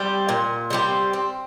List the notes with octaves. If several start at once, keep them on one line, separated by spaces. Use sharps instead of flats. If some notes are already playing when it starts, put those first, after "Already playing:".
Already playing: G3 C4 G4
A#2
G3 C4 G4
C4